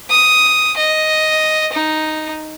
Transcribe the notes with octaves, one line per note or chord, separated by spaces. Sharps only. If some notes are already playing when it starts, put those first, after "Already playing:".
D#6
D#5
D#4